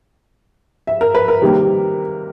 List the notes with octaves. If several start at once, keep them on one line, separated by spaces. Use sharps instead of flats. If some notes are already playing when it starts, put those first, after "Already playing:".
E5
A#4
B4
A#4
C3 D#3 G3 A#3